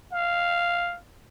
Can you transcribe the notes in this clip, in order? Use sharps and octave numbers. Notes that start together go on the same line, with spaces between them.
F5